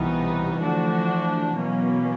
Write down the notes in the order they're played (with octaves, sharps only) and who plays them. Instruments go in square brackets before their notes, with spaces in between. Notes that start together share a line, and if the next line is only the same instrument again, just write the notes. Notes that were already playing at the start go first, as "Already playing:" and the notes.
Already playing: [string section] C2 B2 G3 B3 D#4 [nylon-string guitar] E3
[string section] D3 F3 A3 D4 F#4
B2 F#3 A#3 C#4